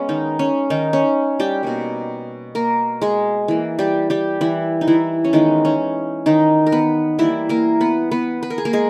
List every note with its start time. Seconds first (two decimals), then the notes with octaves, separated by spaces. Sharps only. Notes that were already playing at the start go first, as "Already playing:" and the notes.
Already playing: G#3 B3 C#4
0.09 D#3 D#4
0.39 C#4
0.70 D#3 D#4
0.93 C#4
1.40 G3 G4
1.63 B2 G3 A#3
2.55 A#3 A#4
3.02 G#3 G#4
3.48 E3 A#3
3.79 G3 G4
4.10 G3 G4
4.41 E3 E4
4.81 D#4
4.87 E3 E4
5.24 C#4
5.33 D#3 E3 G#3 B3 D#4
5.65 C#4
6.26 D#3 D#4
6.67 A#4
6.72 B3 B4
7.19 E3 G3 A#3 E4 E5
7.49 A#3 A#4
7.81 B3 B4
8.11 B3 B4
8.43 B4
8.50 A#4
8.58 G#4
8.65 A#3 A#4
8.73 G#3 G#4